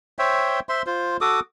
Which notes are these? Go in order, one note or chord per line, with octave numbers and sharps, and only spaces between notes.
C5 C#5 E5 G5
C5 E5 C6
F4 C5
F#4 A4 D6 D#6